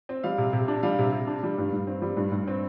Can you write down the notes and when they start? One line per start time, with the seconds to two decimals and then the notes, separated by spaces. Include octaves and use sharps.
0.09 C4
0.24 G3 F5
0.38 C3
0.53 C3
0.68 D4
0.83 G3 F5
0.99 C3
1.12 C3
1.27 D4
1.43 G3
1.58 G2
1.72 G2
1.87 C4
2.02 G3
2.17 G2
2.32 G2
2.47 C4